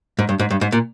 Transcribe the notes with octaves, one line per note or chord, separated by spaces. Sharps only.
G#2
G2
G#2
G2
G#2
A#2